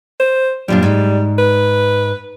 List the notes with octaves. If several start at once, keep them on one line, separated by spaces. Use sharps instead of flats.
C5
F#2 A#2 G3 D4
G#2
B4